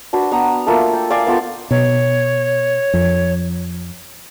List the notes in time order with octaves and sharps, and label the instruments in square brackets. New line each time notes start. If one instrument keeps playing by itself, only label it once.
[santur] D4 F#4 B4
B3 F#5 A#5
A3 A#3 F4 A4
G5
D5 F5 G#5
B3 F4 A4 G5
[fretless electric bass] B2 [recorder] C#5
[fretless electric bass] F2